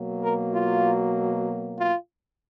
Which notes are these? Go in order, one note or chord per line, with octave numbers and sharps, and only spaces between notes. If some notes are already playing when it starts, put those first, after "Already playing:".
Already playing: B2 F#3 A#3
A#4
F4
F4